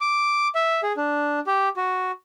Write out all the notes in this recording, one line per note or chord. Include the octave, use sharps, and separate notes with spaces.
D6
E5
G#4
D4
G4
F#4